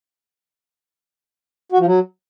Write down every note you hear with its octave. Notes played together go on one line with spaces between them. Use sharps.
F#4
F3
F#3